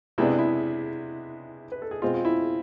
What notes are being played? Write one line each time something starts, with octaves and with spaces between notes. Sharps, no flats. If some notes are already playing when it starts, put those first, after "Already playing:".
C3 G#3 B3 D4 E4
D4
E4
B4
A4
G#4
B2 G#3 C4 F4
F4
E4